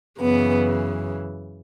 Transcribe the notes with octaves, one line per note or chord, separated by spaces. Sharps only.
F#2 C#3 E3 B3